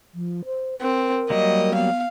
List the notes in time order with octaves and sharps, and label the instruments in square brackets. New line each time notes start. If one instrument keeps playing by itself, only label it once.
[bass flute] F3
C5
[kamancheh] C4 [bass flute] A#4
[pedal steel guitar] F#3 G3 A#3 [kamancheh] D#5
[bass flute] B3 [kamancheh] F5